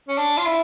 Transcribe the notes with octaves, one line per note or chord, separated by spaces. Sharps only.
C#4
D4
F4
E4